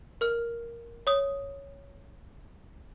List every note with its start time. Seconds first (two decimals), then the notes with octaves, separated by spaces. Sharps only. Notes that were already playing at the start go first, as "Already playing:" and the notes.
0.21 A#4 F6
1.07 C#5 D#6